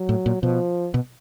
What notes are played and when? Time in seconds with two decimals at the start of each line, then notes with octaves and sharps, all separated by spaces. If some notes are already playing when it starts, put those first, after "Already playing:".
Already playing: F#3
0.09 A2
0.26 A#2
0.43 B2 F3
0.94 B2